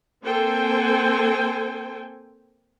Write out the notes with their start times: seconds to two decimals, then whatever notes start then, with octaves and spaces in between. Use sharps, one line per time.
0.25 A#3 C4 A4 C5 G5 G#5